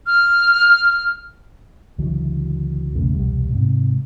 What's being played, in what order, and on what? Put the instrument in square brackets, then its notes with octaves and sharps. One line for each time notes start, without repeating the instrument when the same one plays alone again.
[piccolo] F6
[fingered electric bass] C#2 D3 E3 F#3
B1 E2 C#3 A3
E1 C2 G3
G#2 C3